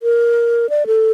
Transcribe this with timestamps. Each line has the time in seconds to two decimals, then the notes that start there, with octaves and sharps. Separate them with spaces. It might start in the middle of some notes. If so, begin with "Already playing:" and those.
0.03 A#4
0.70 D5
0.87 A4